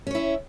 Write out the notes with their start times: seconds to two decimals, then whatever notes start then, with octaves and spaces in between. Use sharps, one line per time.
0.07 C#4
0.11 C#5
0.15 E4